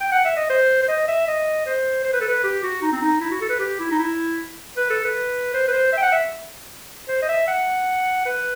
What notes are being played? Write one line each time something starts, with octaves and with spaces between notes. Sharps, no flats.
G5
F#5
E5
D#5
C5
C5
D#5
E5
D#5
C5
C5
B4
A4
B4
G4
F#4
D#4
C4
D#4
E4
F#4
A4
B4
G4
E4
D#4
E4
B4
A4
B4
C5
B4
C5
E5
G5
F#5
E5
C5
D#5
E5
F#5
B4